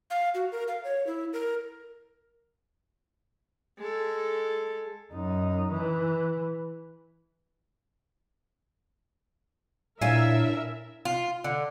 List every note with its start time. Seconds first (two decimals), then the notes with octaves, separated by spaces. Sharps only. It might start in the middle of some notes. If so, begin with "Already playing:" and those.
0.10 F5
0.35 F#4
0.52 A#4
0.68 F5
0.84 C#5
1.07 E4
1.33 A#4
3.78 G#3 A4
5.13 F#2 D#4
5.72 E3
10.01 A#2 D4 E4 A#4 C#5 E5 F5 G#5
11.05 F4
11.44 D3